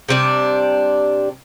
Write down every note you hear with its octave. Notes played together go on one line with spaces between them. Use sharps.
C3 G3 D4